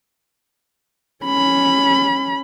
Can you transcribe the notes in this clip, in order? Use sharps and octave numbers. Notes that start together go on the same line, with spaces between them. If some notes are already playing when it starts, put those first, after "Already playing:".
C#4 B5